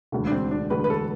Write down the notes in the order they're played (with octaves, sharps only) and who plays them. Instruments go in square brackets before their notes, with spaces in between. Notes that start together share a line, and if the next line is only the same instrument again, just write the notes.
[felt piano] E1 D2 D3
[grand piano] D4
C4
D4
[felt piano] E1 D2 D3 [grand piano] B4
[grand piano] B4
A4